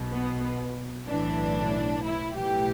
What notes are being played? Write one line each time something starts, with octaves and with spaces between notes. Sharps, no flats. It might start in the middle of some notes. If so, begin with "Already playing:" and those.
Already playing: B1 B2
B3
B1 A2 E3 D4
E4
B1 A2 E3 G4